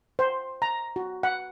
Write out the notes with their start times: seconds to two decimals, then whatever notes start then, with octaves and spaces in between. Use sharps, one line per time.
0.19 C5
0.62 A#5
0.96 F#4
1.23 F#5